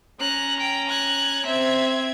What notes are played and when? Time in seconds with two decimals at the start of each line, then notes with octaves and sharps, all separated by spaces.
0.20 C#4 A#5 F#6
0.60 G5
0.89 F#6 G#6
1.46 C4 E5 G#6